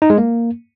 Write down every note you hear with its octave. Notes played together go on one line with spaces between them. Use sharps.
D#4
G#3
A#3